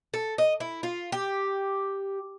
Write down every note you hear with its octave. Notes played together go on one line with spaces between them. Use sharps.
A4
D#5
E4
F4
G4